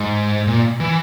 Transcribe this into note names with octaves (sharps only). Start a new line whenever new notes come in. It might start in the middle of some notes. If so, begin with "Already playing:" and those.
Already playing: G#2
A#2
E3